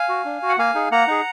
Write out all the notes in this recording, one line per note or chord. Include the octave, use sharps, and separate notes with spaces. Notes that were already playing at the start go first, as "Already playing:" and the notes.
Already playing: F5 G#5
F#4
D4
F#4
F#5
A#3 F5 G#5
D#4 G#4
A#3 F#5 A#5
D#4 G#4